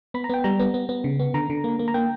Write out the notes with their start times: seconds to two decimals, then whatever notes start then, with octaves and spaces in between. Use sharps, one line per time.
0.14 B3 B5
0.24 A#5
0.29 B3 G5
0.44 G3 A#5
0.59 B3
0.74 B3
0.89 B3
1.04 C#3
1.19 B3
1.34 D3 A#5
1.50 D3
1.64 A#3
1.79 A#3
1.88 A#5
1.94 A#3 G5